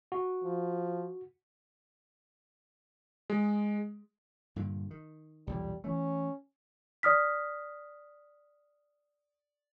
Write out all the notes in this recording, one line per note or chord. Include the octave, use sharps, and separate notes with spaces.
F#4
F3
G#3
G2 A#2 D3
D#3
B1 E2 A#2 G3
E3 A3 C#4
D5 D#6 F6 B6